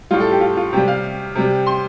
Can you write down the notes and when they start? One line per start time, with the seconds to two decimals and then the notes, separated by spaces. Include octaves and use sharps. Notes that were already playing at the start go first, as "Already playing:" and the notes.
0.11 A2 G3 F4
0.20 A4
0.31 G4
0.41 F4
0.57 F4
0.73 C3 G3 G4
0.88 F5
1.35 C3 G3
1.67 C6